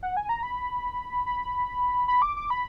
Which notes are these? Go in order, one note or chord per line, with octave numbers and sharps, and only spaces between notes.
F#5
G#5
A#5
B5
B5
B5
D6
D6
B5